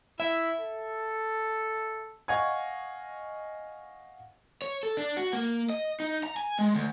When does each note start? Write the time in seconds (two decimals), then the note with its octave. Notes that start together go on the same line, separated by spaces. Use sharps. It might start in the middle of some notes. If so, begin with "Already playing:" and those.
0.20 E4 E5
0.58 A4
2.28 D#5 F5 F#5 G#5 C#6 G#6
4.62 C#5
4.83 A4
4.97 D4
5.17 F#4
5.33 A#3
5.70 D#5
6.00 D#4
6.24 A#5
6.37 G#5
6.59 G#3
6.75 D2